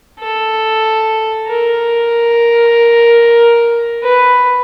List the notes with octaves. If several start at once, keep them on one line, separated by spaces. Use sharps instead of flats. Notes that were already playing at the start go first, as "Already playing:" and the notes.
A4
A#4
B4